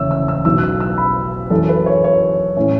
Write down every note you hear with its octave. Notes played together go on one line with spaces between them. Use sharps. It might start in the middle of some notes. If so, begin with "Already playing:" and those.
Already playing: F#1 E2 C#3 E3 A3 C#5 E5 E6
E6
E6
B1 B2 B3 E6
F#6
E6
E6
B5
F#2 E3 C#4 A4
B4
C#5
C#5
A2 A3 C#4